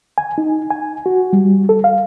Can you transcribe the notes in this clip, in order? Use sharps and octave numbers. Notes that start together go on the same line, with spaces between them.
G#5
D#4
G#5
F#4
G3
A4
F5